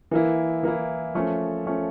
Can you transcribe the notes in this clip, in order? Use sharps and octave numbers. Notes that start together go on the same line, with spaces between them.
E3 A#3 E4
E3 A#3 E4
F3 A3 C#4
F3 A3 C#4